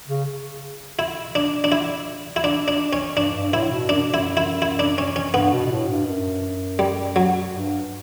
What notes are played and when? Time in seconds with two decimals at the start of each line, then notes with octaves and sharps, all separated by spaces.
0.08 C#3
0.99 E4
1.35 D4
1.64 D4
1.72 E4
2.36 E4
2.44 D4
2.68 D4
2.93 C#4
3.17 G2 D4
3.34 G2
3.53 A2 E4
3.71 B2
3.89 F#2 D4
4.12 F#2 E4
4.37 E4
4.62 E4
4.79 D4
4.98 C#4
5.16 C#4
5.34 G2 B3
5.53 B2
5.66 B2
5.71 A2
5.89 G2
6.06 F#2
6.79 G3
7.16 F#3
7.53 G2